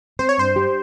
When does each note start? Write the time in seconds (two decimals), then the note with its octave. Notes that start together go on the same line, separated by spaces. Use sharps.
0.19 C4 C5
0.29 C#5
0.38 G2 C5
0.56 G4